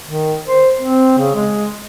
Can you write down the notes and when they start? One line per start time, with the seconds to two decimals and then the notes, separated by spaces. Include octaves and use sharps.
0.07 D#3
0.48 C5
0.80 C4
1.18 C#3
1.35 G#3